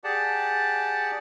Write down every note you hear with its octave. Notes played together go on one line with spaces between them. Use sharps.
G4 G#4 D5 F#5 A5